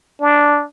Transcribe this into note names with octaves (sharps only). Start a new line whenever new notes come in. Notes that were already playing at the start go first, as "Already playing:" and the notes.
D4